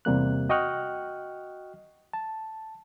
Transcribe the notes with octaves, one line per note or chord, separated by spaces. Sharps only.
E2 C3 G3 A#3 F#6
F#4 D#5 G5 C#6 F6 F#6
A5